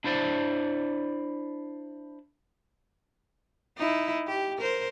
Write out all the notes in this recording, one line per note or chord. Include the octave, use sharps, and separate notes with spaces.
D4 E4 C5 D5 A5
D#4 E4
G4
A#4 C5